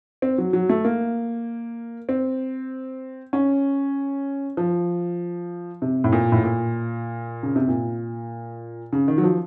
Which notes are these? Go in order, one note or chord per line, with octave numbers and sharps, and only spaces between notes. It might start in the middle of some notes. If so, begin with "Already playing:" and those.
C4
F#3
F#3
A3
A#3
C4
C#4
F3
C3
A2
A#2
A2
A#2
C#3
C3
A#2
C#3
D#3
F#3
F3